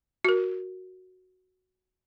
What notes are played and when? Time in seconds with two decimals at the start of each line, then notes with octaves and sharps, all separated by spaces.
0.25 F#4 A#4